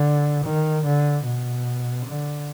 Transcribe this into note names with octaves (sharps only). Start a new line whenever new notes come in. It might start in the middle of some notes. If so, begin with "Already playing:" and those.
Already playing: D3
D#3
D3
B2
D3